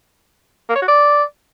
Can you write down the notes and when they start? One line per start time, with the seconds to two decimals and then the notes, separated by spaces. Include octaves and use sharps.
0.69 A#3
0.75 C#5
0.82 F#4
0.88 D5